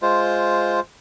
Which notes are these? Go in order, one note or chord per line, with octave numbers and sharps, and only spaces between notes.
G#3 F4 C5